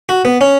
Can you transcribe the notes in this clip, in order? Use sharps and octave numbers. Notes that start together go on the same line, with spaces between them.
F#4
B3
C#4